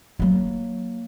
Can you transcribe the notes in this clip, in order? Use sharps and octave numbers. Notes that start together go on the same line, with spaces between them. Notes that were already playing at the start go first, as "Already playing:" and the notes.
F#3 A#3